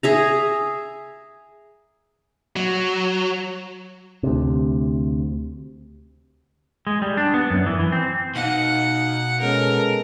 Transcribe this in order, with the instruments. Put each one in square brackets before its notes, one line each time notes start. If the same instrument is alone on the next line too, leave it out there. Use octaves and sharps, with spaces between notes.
[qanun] G#4 E5 A#5
[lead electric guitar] F#3
[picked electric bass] D2 C3
[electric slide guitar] G#3
G3
D4
B3
F#2
E3
E3
C4
[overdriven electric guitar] B2 [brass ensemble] D#4 F5 [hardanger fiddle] F#5
[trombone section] G#3 B3 C#4 [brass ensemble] A4 [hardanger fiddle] A#4